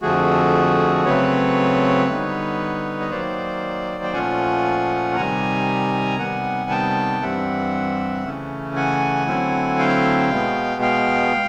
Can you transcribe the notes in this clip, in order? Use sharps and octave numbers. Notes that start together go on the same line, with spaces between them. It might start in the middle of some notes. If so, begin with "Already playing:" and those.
F2 D3 F3 A3 F#4 G#4
C#3 F#3 A3 C4 B4 C#5
D3 G3 B3 D#4
D#5
D#3 F#3 A#3 C5 D5
G5
A#2 F3 A3 C#4 F4 F#5 G#5
C3 D#3 G3 G#5 A#5
C3 D#3 G3 B3 F#5 G#5
G5 A5
G2 E3 G3 C4 E5 F#5
C#3 E3 A3 C#4
F#5 G#5
D3 F#3 A3 C4 E4
F5 G5
B2 G#3 B3
F5 G5